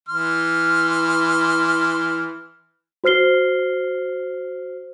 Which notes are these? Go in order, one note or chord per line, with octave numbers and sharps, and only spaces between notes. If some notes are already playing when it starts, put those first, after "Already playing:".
E3 C6 F6
F#4 C5 F6 C7 G7